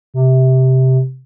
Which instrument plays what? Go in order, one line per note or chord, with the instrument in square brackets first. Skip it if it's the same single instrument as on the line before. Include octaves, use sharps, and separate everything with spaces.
[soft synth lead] C3